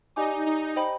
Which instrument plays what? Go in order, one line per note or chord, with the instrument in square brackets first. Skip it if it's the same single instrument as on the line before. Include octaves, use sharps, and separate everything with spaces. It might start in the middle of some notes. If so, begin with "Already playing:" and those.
[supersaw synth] D#4 [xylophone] G4 D5 F5 G#5 D6
[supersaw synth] D#4
[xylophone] C5 D#5 G5 B5